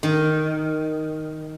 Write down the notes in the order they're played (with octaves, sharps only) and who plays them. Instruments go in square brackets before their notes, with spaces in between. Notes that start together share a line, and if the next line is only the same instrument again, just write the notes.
[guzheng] D#3